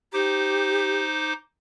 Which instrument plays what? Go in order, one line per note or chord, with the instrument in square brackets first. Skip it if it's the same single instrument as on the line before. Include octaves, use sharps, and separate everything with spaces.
[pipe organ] D#4 C5 D6 [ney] G4